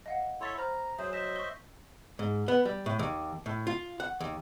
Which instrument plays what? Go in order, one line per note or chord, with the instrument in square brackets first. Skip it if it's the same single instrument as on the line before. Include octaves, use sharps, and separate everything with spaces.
[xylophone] D#5 F5 F#5
[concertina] E4 A4 C#5 [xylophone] C6 A6 B6
[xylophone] C5 B5 F6 [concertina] A#5
[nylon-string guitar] F#3 [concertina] G#4 C5 [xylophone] E5
[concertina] C5 D#5 E5 [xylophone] E7
[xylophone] C#6 G6 G7
[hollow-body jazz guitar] G#2
B3
G3
A2
D#2
A2
F4
F#5
D#2